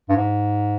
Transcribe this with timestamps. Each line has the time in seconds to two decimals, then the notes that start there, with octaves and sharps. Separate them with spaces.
0.09 G2
0.16 G#2